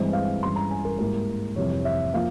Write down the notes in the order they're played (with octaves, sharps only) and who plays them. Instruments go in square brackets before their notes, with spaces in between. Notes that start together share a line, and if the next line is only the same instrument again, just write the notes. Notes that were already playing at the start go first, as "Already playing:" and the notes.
Already playing: [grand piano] G2 E3 G#3 C4
F5
G2 E3 G#3 C#4 C6
A#5
G#5
A#4
G#2 G3 A#3 E4 A#4
F2 C3 E3 G3 C#5
E5
F3 A#3 F5